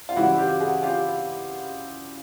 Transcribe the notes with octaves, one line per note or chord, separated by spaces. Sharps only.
F4
C#3 E3 G3 E4 F#4
F4 G4
F#4 G#4
F4 G4